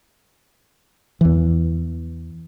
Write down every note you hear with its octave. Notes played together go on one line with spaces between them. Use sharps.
E2 E3